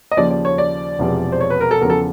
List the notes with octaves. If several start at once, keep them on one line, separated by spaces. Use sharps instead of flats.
D#5
D#2 C#3 F3 D5
D5
C#5
D5
E1 E2 C3 F3
C5
C#5
B4
A#4
A4
E2 C#3 F3 A#4
A4